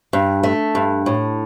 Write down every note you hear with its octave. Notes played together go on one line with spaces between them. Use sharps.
G2
A3
G2
A2